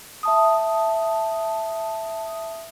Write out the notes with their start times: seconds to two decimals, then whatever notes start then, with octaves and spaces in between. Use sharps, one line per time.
0.23 E5 A5 D#6